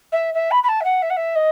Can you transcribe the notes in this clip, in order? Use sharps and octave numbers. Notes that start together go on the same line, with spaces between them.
E5
E5
B5
B5
A5
E5
F#5
E5
F#5
E5
D#5